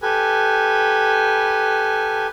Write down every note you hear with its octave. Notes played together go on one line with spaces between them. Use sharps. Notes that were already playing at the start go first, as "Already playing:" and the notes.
G4 A4 B4 G#5